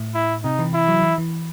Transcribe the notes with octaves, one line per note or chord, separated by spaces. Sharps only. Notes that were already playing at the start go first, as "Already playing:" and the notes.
Already playing: A2
E4
C3 D#4
E3
E3 E4
F#3
E3
E3